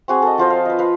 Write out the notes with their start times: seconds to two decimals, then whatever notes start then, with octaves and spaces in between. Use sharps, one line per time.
0.08 C4 F#4 G#4
0.22 A4 D#5
0.38 F3 F4 C5 D#5
0.50 F5
0.65 B4 D#5
0.79 B4 F5